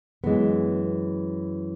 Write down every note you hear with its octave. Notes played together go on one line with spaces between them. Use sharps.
F#2 E3 G#3 B3